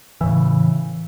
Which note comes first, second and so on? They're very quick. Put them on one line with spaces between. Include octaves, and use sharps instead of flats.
E3 A2 C#3